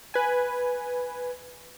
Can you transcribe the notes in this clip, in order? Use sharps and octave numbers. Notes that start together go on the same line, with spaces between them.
B4 G#5